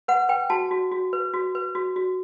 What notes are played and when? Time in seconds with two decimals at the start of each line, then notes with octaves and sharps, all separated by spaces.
0.08 B4 F#5
0.29 B4 G5
0.50 F#4 A5
0.71 F#4
0.91 F#4
1.13 B4
1.34 F#4
1.55 B4
1.75 F#4
1.96 F#4